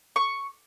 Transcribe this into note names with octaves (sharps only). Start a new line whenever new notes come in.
C#6